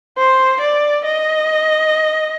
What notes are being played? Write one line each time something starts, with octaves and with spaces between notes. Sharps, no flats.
C5
D5
D#5